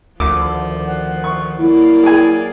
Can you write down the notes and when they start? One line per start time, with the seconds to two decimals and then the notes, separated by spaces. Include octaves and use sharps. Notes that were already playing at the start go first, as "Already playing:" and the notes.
0.20 D2 D#3 F3 D6
0.87 F#5
1.24 C#6
1.59 F#3 A#3 E4 D5
2.04 G#4 G#5